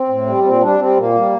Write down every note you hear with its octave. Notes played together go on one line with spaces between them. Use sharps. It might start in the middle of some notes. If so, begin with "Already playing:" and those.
Already playing: C4
A2
G3
A#2 C4
G3 D4
G3 C4
A#2 A#3
G3